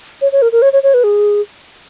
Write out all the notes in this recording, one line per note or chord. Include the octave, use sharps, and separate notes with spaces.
C#5
C#5
A#4
A#4
C#5
C#5
C#5
B4
G#4